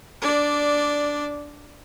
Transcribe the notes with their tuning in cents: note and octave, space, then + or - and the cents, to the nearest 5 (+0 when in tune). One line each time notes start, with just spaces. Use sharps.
D4 -10 D5 +0